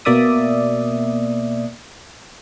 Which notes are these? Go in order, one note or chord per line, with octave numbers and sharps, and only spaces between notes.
B2 A#3 D5 E5 D#6